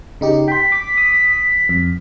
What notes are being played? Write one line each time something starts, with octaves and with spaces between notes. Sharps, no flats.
C#3 D#4 G4
G5 C6 B6
D6
D#6
F2